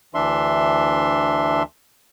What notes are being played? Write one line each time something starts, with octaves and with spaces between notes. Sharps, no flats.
D2 E3 D4 E5 C6